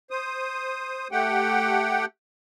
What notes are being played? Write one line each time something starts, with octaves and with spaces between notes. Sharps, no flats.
C5 D#6
A3 G4 F#5 G5